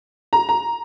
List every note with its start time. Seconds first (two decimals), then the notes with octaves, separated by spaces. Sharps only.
0.33 A#5
0.49 A#5